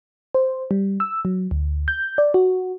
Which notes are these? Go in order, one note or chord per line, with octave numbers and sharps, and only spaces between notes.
C5
G3
E6
F#3
D2
G6
D5
F#4